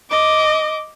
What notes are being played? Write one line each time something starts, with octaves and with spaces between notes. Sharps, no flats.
D#5 D6